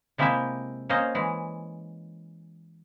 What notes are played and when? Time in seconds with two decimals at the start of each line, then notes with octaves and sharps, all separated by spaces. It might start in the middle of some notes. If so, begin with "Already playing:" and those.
0.18 C3 G#3 A#3 E4 G4 E5
0.89 A#3 C#4 C5 D#5
1.15 E3 G#3